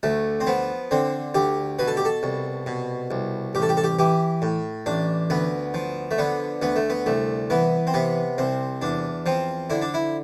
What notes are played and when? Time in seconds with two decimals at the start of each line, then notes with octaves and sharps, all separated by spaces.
0.03 D2 A3
0.40 C4
0.47 F3 B3
0.91 D3 C4
1.34 D2 G4
1.79 B2 B4
1.88 A4
1.97 G4
2.05 A4
2.23 C2
2.66 B2
3.11 C2
3.55 A1 G4
3.62 A4
3.69 G4
3.77 A4
3.84 G4
3.99 E3 G4
4.42 A2
4.86 A1 D4
5.30 D2 B3
5.74 F3
6.11 A3
6.18 D3 B3
6.62 D2 B3
6.76 A3
6.90 B3
7.06 C2 A3
7.50 E3 B3
7.87 C4
7.94 C3 B3
8.38 C2 C4
8.82 E2 D4
9.26 F3 C4
9.70 D3 E4
9.82 D4
9.94 E4